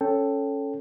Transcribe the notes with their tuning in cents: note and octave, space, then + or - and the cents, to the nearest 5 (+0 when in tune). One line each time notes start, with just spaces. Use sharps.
C#4 +0 A4 +0 G5 +0